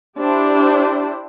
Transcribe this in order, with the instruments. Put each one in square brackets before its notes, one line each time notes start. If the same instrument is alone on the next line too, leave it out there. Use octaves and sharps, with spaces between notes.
[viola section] D4 E4 G4 C5